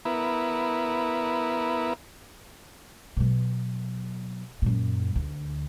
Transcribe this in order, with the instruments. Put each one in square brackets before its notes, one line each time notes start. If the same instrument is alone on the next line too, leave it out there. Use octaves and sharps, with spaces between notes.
[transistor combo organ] B3 E4 A#4
[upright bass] B2 F#3
F#2 A#2
D2